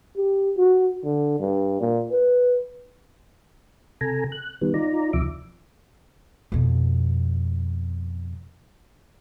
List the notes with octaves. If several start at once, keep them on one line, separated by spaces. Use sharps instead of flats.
G4
F#4
D3
G2
A#2
B4
C3 A4 G#5 A#5
F#6
D#3 G3 B3
D#4 F4 D5 A#5
D2 C3 F3 E5 D6
F2 B2